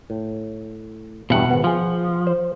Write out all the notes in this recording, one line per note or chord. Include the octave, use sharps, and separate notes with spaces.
A2
E2 G2 B2 F#5
G#1 B3
F3 F4 G#4
C5